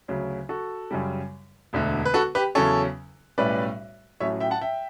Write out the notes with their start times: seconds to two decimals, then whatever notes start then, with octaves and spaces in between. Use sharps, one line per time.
0.08 D2 C#3 F#3
0.49 F#4 A4
0.91 F#2 C#3 G3
1.73 E1 D2 D3
2.05 B4
2.14 F#4 A4
2.35 G4 B4
2.55 E2 C#3 F#3 C#4 A4 C#5
3.38 B1 A2 G3 C#4 B4 D5
4.20 A1 A2 F#3 A3 C#4 C#5 E5
4.40 E5 G5
4.51 F#5 A5
4.61 E5 G5